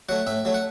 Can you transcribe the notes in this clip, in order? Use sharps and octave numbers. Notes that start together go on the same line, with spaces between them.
F#3 A3 F#5
A2 E5
F#3 A3
F#5